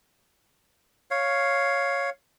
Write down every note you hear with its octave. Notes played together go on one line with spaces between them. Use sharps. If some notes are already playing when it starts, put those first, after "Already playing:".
C#5 F5